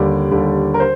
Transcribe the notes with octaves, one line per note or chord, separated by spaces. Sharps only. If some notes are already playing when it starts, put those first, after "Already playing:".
Already playing: D#2 D3 G3 D5
D#2 D3 G3
A#4
C5